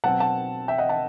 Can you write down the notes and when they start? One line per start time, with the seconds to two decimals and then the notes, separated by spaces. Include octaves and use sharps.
0.04 B2 F#3 C4 F#5 A5
0.20 F#5 A5
0.68 E5 G5
0.78 D#5 F#5
0.89 F#5 A5